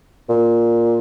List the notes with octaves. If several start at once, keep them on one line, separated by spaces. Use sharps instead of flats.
A#2